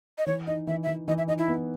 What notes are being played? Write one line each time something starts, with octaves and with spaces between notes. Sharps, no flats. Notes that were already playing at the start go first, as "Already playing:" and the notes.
D#5
E3 C#5
D#4 D#5
E3 E5
E5
E3
E3 D#5
E5
D#4 D#5
E4
B3